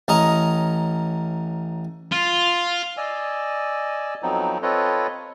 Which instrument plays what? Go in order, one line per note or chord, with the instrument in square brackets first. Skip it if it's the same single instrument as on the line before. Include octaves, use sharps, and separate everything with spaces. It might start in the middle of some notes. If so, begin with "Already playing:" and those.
[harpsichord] A1 C#4 D#5 A#5
[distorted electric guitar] F4
[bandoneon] D5 D#5 G#5 E6
F2 F3 F#3 B3 C4 D#4
C4 F4 A4 B4 C#5 D#5